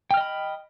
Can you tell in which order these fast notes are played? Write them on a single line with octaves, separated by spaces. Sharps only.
G5 F6 D#5 B5